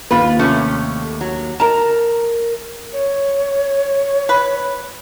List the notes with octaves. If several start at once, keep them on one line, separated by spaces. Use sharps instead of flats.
D#2 F4 B4
C3 A3 C#4
F#3
A#4 A5 A#5
C#5
B4